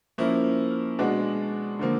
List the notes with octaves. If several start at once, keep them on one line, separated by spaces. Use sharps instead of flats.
F3 A#3 C#4 E4
B2 G#3 B3 D4 F#4
D3 F3 A#3